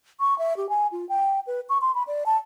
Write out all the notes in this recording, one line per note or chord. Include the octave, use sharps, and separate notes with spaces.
C#6
E5
G4
G#5
F4
G5
B4
C#6
C6
B5
D5
A5